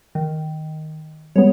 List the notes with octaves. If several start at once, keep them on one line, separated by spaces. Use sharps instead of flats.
D#3
G3 G#3 B3 C#5